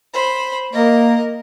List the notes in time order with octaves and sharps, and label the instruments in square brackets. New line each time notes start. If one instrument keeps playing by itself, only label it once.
[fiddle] C5 B5
[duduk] A#3 [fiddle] A#4 D#5